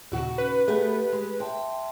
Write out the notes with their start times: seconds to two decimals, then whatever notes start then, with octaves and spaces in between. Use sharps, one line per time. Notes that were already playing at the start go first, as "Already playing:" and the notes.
0.12 D#2 A#2 C#3 D#4 F#4
0.38 C#4 B4
0.68 A3 B3 G4 G#4
1.13 G#3
1.40 E5 G5 A5 C6